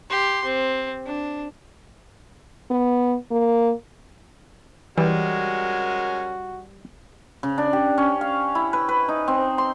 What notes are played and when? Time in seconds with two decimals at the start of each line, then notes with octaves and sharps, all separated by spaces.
0.10 G4 C6
0.45 C4
1.07 D4
2.70 B3
3.31 A#3
4.98 E3 G3 G#3 C#4 F#4 A#4
7.43 C#3
7.58 D4
7.73 G4
7.98 C#4
8.21 F5
8.55 E4
8.73 B4
8.89 B4
9.09 D#4
9.28 C4
9.58 C6